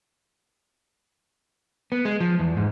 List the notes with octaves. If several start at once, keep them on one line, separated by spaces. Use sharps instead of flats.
B3
G#3
F3
E2
G#2